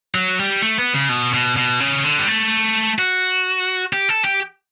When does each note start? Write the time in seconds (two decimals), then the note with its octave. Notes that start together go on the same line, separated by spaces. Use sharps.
0.15 F#3
0.39 G3
0.62 A3
0.78 B3
0.94 C#3
1.09 B2
1.34 B2
1.57 B2
1.80 C#3
2.04 D3
2.19 G3
2.28 A3
2.99 F#4
3.93 G4
4.09 A4
4.25 G4